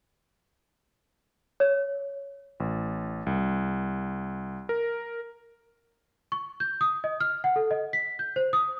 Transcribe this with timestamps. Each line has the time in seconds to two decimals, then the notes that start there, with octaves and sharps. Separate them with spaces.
1.60 C#5
2.60 A1
3.26 C2
4.69 A#4
6.32 C#6
6.60 G6
6.81 D#6
7.04 D#5
7.20 F6
7.44 F#5
7.56 A4
7.71 D#5
7.93 B6
8.19 G6
8.36 C5
8.53 D#6